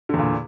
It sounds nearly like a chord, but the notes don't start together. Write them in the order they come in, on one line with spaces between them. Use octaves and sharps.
D3 E2 A#2